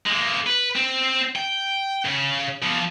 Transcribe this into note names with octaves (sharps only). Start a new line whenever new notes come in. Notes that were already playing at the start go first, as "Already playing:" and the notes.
G#3 A#3
B4
C4
G5
C#3
F3 B3